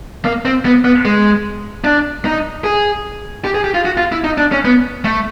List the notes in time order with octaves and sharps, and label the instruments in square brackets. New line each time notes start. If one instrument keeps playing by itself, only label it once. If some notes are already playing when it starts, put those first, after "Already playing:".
[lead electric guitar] A#3
C4
B3
B3
G#3
D4
D#4
G#4
G4
G#4
G4
F4
F#4
F4
E4
D#4
D4
C#4
B3
A3